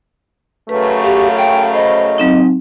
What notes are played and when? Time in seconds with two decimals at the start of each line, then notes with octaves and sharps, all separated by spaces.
0.69 F#2 C#3 A3 B4
1.04 G4 F5
1.37 G5
1.73 C5 D#5 B5
2.18 F#3 C4 D#4